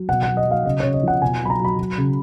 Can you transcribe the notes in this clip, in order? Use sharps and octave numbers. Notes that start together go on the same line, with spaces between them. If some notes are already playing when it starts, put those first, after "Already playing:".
Already playing: F#3
B2 F#5
F#3 F#5
D#5
F#3 F5
C#3 D#5
C#3 C#5
D#5
F3 F#5
B2 G#5
F#3 B5
A#5
F#3 B5
F#3
C#3